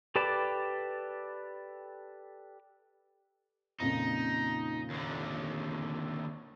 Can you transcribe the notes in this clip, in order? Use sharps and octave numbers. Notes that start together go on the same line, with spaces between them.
G4 A4 B4 D5 A5
F2 A#2 C#3 D#4
D#2 D3